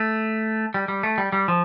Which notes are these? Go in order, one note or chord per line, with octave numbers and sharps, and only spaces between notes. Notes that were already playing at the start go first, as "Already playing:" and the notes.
Already playing: A3
G3
G3
A3
G3
G3
F3